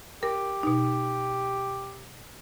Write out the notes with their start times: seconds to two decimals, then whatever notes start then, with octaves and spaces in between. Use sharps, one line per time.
0.23 G4 A#4
0.63 B2 D#4